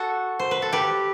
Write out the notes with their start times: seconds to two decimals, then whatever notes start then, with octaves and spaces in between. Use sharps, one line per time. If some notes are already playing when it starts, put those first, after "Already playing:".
Already playing: F#4 A4
0.39 C5
0.51 B4
0.62 A4
0.73 G4 B4